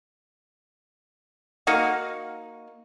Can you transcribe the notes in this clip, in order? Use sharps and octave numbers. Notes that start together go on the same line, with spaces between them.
A#3 D#4 F#4 F5